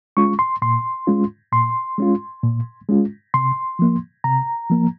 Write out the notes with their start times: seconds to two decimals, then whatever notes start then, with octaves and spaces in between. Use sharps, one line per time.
0.17 G#3 C#4 F4 C#6
0.39 C6
0.62 A#2 C6
1.07 G#3 C#4 F4
1.52 A#2 C6
1.98 G#3 C#4 F4
2.43 A#2
2.89 G#3 C#4 F4
3.34 C3 C6
3.79 F3 A#3
4.24 C3 A#5
4.70 F3 A#3